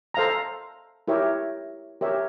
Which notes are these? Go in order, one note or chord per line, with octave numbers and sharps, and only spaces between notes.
A4 C5 F5 A#5
E4 G4 A#4 C#5 E5
G4 A#4 C#5 E5